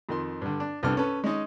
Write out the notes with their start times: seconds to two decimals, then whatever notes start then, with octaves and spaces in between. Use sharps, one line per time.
0.09 F2 D#3 C6
0.42 G2 D3
0.60 D4
0.83 C2 G2 B3 D4 A4 F6
0.97 C#4 A4 B4
1.24 G#3 C#4 D#4 D#5